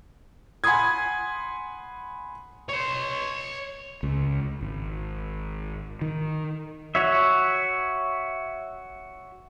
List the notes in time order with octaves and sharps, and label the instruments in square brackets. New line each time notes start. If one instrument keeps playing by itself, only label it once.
[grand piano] F#5 G#5 B5 C6 D#6 G#6
[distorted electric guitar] C#5 C6
[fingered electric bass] C#2
G#1
D#3
[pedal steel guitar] F#4 C#5 E5